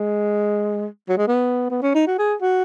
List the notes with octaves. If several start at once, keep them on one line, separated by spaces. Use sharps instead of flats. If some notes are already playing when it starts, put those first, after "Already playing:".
Already playing: G#3
F#3
G#3
B3
B3
C#4
D#4
F#4
G#4
F#4